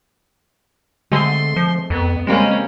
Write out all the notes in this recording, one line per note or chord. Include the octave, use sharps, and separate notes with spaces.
D3 G#3 A3 C4 C6
F3
F2 B3
C#3 G3 G#3 A#3 C4 C#4